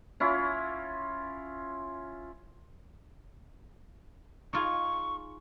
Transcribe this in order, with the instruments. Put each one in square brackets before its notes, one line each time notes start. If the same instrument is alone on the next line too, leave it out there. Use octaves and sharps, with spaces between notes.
[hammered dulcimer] C#4 E4 F4
[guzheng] D#4 F4 G#4 [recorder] C#6